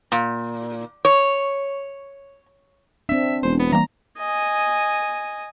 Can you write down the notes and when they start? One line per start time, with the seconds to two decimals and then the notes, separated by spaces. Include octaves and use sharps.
0.12 A#2
1.05 C#5
3.09 C4 D4 E5
3.43 E1 C5
3.59 B3
3.72 E3 G3 A#3 A#5
4.18 D#5 G#5